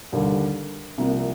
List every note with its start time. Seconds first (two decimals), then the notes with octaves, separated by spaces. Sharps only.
0.12 D#2 D3 G3
0.98 C2 C3 F3 A#3